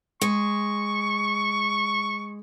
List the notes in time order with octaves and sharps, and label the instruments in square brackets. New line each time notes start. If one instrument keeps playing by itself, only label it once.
[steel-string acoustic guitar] G#3 [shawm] C#6